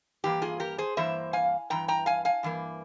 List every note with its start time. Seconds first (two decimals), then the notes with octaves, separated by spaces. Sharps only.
0.24 G2 E3 A#3 G4
0.42 F4 G#4
0.60 G4 A#4
0.78 G#4 C5
0.97 G2 E3 A#3 C5 E5
1.33 F5 G#5
1.70 G2 E3 G5 A#5
1.88 G5 A#5
2.06 F5 G#5
2.25 F5 G#5
2.43 G2 E3 A#3